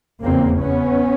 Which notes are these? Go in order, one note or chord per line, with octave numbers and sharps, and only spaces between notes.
F1 E2 C#3 A#3 C4
B3 C#4